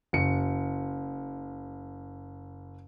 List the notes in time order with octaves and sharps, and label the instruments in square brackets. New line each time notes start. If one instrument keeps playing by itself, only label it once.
[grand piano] F#1 C#7